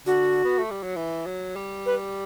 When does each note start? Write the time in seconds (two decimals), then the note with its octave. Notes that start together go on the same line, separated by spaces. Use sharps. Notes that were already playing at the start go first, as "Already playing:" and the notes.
0.05 D3 F#4
0.45 B3
0.58 A3
0.71 G3
0.83 F#3
0.96 E3
1.26 F#3
1.56 G3
1.86 B4